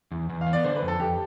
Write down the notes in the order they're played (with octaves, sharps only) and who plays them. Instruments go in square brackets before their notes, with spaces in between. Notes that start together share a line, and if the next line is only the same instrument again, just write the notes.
[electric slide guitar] E2
E2
[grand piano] F5
[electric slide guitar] B3
[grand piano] D5
[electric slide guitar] D3 [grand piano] C5
[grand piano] B4
[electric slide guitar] F2
[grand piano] A4
[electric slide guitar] F2 [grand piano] G4